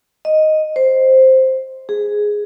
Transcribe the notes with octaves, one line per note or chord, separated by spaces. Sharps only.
D#5
C5
G#4